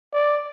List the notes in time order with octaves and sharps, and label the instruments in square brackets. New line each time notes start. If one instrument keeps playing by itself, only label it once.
[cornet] D5